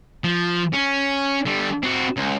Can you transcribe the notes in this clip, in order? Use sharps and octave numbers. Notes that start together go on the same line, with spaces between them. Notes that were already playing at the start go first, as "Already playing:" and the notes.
F3
C#4
D3 G3
C4 F#4
C#2